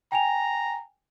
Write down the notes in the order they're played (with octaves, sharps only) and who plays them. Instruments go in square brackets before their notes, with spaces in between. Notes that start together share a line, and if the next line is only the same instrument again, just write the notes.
[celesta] G5 G#5 F7 [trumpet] A#5